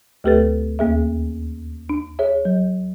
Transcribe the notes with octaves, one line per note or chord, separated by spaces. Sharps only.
D2 A3 G4 A4 B4 A6
D#2 A#3 G#4 E5
D4
G#4 C#5 E5
F#3